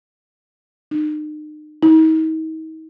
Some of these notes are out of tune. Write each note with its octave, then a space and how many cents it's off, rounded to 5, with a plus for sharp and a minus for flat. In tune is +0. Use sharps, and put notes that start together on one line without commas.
D#4 -40
D#4 +40